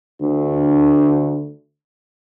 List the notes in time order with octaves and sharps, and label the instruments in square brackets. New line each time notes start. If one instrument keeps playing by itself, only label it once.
[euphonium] D2 [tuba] D3